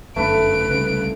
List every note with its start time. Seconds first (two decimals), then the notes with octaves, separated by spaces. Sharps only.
0.16 G1 F#2 A3 B4 D7
0.69 C2 C#3 G3